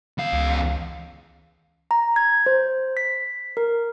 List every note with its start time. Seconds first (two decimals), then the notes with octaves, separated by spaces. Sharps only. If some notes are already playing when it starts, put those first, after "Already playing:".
0.18 E2 F5
0.33 C#2
1.91 A#5
2.16 G#6
2.46 C5
2.97 B6
3.57 A#4